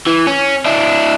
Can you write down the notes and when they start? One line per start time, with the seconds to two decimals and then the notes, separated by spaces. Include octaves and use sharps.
0.07 E3
0.27 C#4
0.65 D4 E4